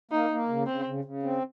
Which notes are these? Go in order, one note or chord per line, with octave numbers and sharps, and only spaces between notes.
A#3 D#4
A#3
C#3
C#3 C4
C#3
C#3
C4